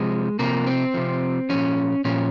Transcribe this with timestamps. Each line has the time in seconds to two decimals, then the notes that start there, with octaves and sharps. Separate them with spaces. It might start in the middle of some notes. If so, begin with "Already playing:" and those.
Already playing: C3 F3 G#3
0.39 C3 F3 A#3
0.67 C4
0.94 C3 F3
1.49 A#2 F3 C#4
2.05 A#2 F3 C#4